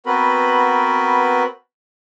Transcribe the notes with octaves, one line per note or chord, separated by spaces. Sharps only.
B3 C4 F#4 A#4 B4 B5